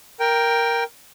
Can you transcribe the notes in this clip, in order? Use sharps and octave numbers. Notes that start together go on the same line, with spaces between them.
A#4 G5